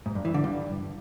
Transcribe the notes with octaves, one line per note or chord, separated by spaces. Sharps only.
G#2
G2
E3
D3
G2